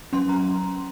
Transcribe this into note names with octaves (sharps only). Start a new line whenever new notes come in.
F#3 C#4 C6
A#5